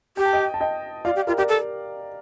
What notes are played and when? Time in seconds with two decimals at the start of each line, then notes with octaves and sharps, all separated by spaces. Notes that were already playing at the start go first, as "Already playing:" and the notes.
0.17 G4 G5
0.25 A5
0.33 D#5 G5
0.54 A5
0.61 D#5 G5
1.05 F4 D5 F5
1.16 G4
1.27 F4 G4 A#4
1.38 G4 A#4 D5
1.49 A4